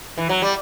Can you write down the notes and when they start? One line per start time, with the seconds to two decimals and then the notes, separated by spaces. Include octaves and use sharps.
0.18 E3
0.29 F#3
0.42 G3